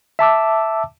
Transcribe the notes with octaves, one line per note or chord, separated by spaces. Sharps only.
E5 A5 D6 E6